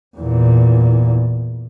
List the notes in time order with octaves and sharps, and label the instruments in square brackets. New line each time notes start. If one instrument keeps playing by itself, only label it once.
[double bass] E2 A#2